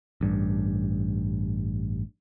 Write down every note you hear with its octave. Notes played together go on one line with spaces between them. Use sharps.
A1 G2